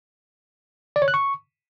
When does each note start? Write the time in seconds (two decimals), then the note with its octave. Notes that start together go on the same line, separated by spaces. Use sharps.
0.96 D5
1.02 C#5
1.08 F#6
1.14 C#6